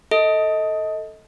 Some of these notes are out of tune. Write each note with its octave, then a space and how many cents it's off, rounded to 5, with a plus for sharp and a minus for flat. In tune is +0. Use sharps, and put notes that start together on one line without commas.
A4 +10 D#5 +25